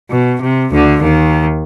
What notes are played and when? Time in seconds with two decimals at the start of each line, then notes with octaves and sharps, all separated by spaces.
0.11 B2
0.41 C3
0.71 D2 D3
1.01 D#2 D#3